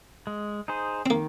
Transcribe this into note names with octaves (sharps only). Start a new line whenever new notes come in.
G#3
D#4 G#4 C5
C4
D#3 A#3